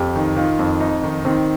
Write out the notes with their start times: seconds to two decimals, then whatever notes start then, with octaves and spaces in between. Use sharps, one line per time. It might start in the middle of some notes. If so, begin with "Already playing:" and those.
Already playing: F2 G4
0.16 D#3
0.36 D#3 F4
0.59 F2
0.80 F2 D#4
1.03 D#3
1.25 D#3 C4